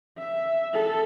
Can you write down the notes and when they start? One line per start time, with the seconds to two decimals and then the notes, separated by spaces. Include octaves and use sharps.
0.19 E5
0.73 A4